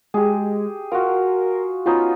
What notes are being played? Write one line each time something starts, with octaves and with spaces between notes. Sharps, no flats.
G#3 G4 G#4
F4 F#4 A#4
B3 C#4 D#4 F4